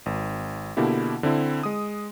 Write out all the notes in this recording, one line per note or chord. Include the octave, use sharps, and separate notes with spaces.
G#1
B2 D3 A#3 E4 G4
D3 C4 E4
G#3 D#6